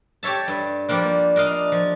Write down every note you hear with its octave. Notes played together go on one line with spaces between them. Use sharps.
G4 A4 C#5 E5 A5
G2
F3 G3 A#3 D4
D4 A#4 D#5 F5
F3